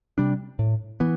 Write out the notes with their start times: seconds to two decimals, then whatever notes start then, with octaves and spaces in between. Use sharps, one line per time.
0.18 C3 G3 D4
0.59 A2
1.00 E3 B3